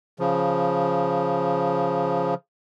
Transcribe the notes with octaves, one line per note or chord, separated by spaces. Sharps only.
C#3 F3